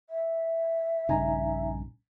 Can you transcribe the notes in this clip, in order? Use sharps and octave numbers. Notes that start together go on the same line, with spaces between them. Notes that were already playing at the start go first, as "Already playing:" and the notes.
E5
A#1 G2 C#3 D#4 G#5 A#5